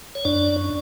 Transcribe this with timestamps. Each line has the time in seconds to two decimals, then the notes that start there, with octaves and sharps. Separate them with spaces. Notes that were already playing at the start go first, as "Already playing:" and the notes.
0.15 C#5
0.25 F#2 D4 D5